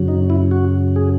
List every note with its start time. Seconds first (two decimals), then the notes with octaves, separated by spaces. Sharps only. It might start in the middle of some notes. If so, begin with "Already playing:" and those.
Already playing: F#2 C#3 F#3
0.08 D#4
0.30 E4
0.51 F#4
0.96 G#4